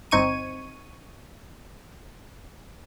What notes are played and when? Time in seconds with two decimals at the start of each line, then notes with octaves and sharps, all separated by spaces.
0.11 G1 C4 D#4 C#6 G#6 D#7